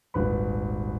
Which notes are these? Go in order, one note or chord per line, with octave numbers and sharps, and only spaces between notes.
D#1 G#1 B4 B5